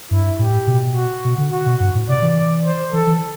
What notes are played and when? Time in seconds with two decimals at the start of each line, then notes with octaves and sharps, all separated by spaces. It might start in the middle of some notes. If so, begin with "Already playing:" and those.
0.11 G2 E4
0.39 A2 G4
0.67 B2
0.96 F#4
1.25 B2
1.38 D3
1.52 F#4
1.66 B2
1.80 G2
1.95 A2
2.09 C3 D5
2.22 E3
2.37 D5
2.65 C5
2.93 E3 A4
3.07 E3